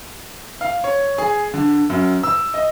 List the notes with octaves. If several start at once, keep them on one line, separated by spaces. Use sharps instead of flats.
F5
C#5
G#4
D3
F#2
E6
D#5